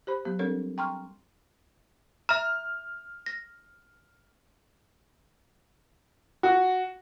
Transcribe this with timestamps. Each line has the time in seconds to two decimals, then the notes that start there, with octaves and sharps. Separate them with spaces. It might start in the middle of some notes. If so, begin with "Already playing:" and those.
0.07 G4 C5 B5
0.25 F#3 B3 G4
0.39 G3 C4 D4 A4 A#4 C#5
0.78 G5 A#5 C6 C#6 F6
2.29 E5 A#5 F6
3.26 A#6
6.43 F#4